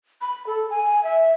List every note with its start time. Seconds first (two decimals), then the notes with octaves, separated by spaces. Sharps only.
0.21 B5
0.47 A4
0.70 G#5
1.03 E5